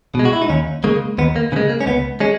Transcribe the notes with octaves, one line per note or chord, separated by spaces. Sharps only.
B2 G#3
F#4
E4
D#4
D#2 C#4
C#3 G#3 A#3
D#2 B3
A#3
C#3 G#3 B3
A#3
C#4
C#2 B3
G#3 C#4